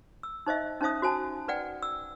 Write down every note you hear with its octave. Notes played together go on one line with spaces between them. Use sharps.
E6
D#4 C5 D#5 E5
C#4 D#4 C5 E5 D#6
F#4 C5 G#5 A5
B4 D5 F#5 G5
E6